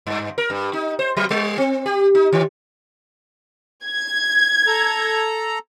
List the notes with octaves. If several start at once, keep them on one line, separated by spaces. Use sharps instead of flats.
G2
A#4
G2
D#4
C5
F#3
G3
C4
G4
D#4
D#3
G#6
A4 A#5